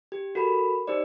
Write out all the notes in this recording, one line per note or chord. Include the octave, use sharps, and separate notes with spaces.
G4
F#4 A4 A#4 B5
D#4 G4 C5 D5